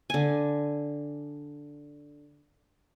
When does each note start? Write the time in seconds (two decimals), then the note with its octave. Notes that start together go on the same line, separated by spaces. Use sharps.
0.10 D3 G#5